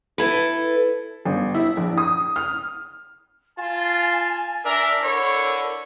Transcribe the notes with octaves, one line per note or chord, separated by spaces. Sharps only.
E4 A4 B4
G1
E4
A#1
D#6
F6
F4 G#5 A5
D4 A#4 E5
D3 E4 A#4 C#5